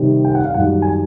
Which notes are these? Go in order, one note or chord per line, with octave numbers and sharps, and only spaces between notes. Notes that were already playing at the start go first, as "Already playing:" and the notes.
Already playing: C3 D#3 G3 C4
G5
F#5
F5
F#2 D#3 G3 F#5
G#5